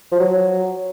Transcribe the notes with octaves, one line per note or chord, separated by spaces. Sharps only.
F3
F#3